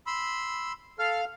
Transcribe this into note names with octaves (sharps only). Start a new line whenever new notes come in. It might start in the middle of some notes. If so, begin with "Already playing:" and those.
B5 C6 E6
A4 F5 F6